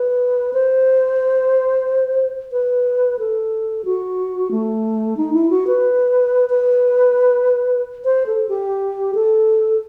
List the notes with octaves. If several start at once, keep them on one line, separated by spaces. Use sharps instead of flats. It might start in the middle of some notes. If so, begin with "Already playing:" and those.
Already playing: B4
C5
B4
A4
F#4
A3
D#4
E4
F#4
B4
B4
C5
A4
G4
A4